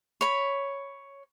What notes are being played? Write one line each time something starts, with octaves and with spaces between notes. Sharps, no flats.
C#5 B5